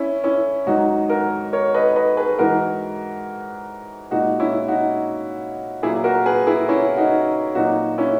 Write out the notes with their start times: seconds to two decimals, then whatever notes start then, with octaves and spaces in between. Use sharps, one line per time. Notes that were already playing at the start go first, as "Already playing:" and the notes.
Already playing: C#4 E4
0.24 C#4 E4
0.67 G#2 D#3 F#3 D#4 F#4
1.09 F#4 A#4
1.53 A#4 C#5
1.74 B4 D#5
1.96 B4 D#5
2.17 G#4 B4
2.39 G#2 E3 G#3 F#4 A#4
4.11 A#2 G#3 D#4 F#4
4.40 C#4 E4
4.68 D#4 F#4
5.83 A#2 F#3 E4 G#4
6.04 F#4 A#4
6.26 G#4 B4
6.47 E4 G#4
6.69 C#4 E4
6.97 D#4 F#4
7.55 A#2 F#3 D#4 F#4
7.98 C#4 E4